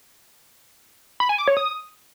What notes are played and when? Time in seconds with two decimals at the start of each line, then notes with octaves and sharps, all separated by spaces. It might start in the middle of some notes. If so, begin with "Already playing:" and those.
1.20 B5
1.29 G#5
1.38 D6
1.48 C#5
1.57 D#6